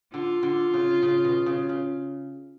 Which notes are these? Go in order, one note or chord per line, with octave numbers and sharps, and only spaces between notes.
D3 F4
D3
C#3
C#3
B2
C#3
C#3